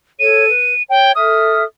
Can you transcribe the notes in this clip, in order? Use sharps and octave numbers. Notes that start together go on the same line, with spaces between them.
A4 C#5 D#7
B4
C#5 G5
A4 E5 D#6 F6